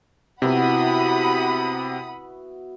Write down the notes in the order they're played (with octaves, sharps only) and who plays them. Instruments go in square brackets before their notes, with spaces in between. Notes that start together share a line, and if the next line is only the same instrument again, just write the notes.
[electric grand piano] C3 [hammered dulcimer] B3 E4 F#4 [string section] F#5 B5 D#6